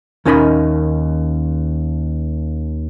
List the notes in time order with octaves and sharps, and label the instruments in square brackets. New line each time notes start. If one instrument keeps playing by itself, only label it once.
[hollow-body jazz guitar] D#2 C#4 D#4 A#4 D#5 B5